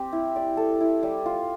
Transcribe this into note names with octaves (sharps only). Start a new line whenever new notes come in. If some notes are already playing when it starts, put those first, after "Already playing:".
Already playing: C4 G4
E4
D5
A4
E4
G3
F4